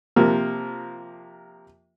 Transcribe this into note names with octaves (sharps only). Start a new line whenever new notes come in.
C3 F3 A#3